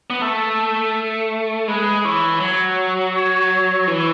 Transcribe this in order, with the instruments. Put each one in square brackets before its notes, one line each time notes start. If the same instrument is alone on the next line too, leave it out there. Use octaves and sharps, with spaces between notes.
[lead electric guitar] B3
[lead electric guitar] A3 [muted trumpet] A4
[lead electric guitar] G#3 [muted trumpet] B4
[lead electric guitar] E3 [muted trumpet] C#5
[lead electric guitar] F#3 [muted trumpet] C#5
[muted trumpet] C#5
[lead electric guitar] E3